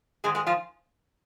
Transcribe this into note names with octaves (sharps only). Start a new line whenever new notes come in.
G#2 D#3 G#3 G#4
G#3 G#4
F3 F4